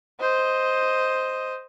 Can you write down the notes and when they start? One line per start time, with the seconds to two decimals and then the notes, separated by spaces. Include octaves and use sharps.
0.20 C5 D#5